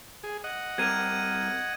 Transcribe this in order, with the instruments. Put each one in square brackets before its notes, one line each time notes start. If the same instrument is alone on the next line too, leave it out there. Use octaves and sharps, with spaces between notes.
[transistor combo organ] G#4
D#5 F#5
[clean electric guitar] G3 C4 A#4 [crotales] G#6 D#7